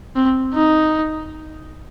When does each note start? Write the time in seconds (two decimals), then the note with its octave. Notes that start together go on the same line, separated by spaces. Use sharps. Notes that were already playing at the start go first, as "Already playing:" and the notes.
0.16 C4
0.54 D#4